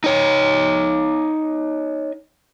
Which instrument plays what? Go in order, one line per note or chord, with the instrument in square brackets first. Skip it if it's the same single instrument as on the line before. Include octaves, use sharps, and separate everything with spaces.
[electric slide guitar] D#4 C#5